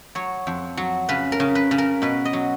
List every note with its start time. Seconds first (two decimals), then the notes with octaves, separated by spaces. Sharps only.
0.15 F#3 C#5
0.47 F2
0.77 F#3
1.09 C#3 B4
1.32 A#4
1.40 C#3
1.55 B4
1.71 C#3
1.78 A#4
2.02 B2 B4
2.25 D#5
2.33 F#3